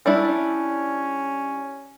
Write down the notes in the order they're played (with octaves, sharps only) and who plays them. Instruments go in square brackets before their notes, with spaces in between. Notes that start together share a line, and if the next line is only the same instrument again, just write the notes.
[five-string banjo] G3 D4 E4 [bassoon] C#4